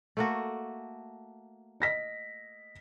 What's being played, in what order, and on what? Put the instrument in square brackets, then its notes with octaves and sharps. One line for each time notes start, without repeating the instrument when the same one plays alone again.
[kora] A3 A#3 F#4
[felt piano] D#5 A#6 B6